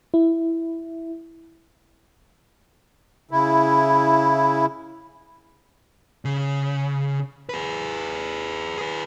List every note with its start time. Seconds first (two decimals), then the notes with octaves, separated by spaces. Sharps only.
0.14 E4
3.31 C#3 E4
6.25 C#3
7.49 G#4 B4
8.78 G#4 B4